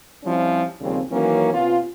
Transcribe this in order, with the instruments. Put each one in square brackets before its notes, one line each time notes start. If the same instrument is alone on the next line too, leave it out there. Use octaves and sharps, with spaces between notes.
[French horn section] F3 G3 C4 C#4 E4 F4
D#2 C#3 F3 G3 C4
D#3 E3 F#3 A#3 C#4
C3 B3 C#4 F4